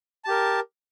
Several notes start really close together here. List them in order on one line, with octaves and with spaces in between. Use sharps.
A5 G4 A#4